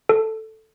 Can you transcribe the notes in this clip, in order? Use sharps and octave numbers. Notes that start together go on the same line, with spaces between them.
A4